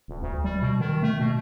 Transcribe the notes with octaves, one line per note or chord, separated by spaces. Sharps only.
D#1
D2
G3
B2
D#3
A3
B2